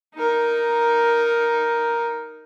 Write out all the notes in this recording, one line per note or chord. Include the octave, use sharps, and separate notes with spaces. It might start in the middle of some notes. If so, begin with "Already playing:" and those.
D#4 A#4